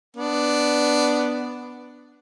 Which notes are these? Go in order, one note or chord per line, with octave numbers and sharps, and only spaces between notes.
B3 D4